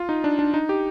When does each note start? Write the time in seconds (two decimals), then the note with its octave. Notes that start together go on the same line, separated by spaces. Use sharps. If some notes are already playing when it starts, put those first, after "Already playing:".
Already playing: F4
0.09 D#4
0.24 D4
0.39 D4
0.54 D#4
0.69 G4